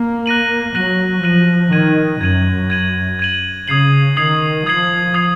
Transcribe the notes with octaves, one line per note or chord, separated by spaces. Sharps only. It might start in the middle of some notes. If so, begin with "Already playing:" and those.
Already playing: A#3
F#6 A#6 D#7 F#7
F#3 F#6 A#6 D#7 F#7
F3 F#6 A#6 D#7 F#7
D#3 G#6 D#7 F#7
F#2 G#6 D#7 F#7
G#6 D#7 F#7
G#6 D#7 F#7
C#3 D#6 G#6 C7 F#7
D#3 D#6 G#6 C7 F#7
F3 D#6 G#6 C7 F#7
D#6 G#6 C7 F#7